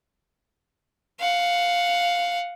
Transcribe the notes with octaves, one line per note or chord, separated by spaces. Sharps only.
F5 F#5